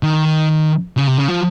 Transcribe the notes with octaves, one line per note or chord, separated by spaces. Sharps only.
D#3
C#3
C3
C#3
F3